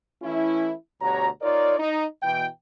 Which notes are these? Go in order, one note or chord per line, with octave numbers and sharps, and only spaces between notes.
E3 A3 C#4 E4
D2 B2 F#4 G4 C#5 A#5
D#4 F4 A#4 C#5 D5
D#4
B2 E3 G5